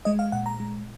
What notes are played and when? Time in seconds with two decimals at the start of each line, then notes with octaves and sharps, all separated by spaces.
0.05 G#3 D#5
0.19 F5
0.32 A#2 F#5
0.46 A#5
0.60 G#3